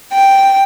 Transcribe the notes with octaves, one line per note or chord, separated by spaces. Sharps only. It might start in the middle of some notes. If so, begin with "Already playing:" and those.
G5